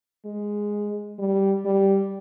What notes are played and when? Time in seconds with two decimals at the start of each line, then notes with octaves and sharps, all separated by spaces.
0.25 G#3
1.19 G3
1.65 G3